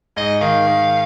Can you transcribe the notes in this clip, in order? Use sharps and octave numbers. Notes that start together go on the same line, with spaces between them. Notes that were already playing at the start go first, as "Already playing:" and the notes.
G#2 D#5
D#3 F5
D#3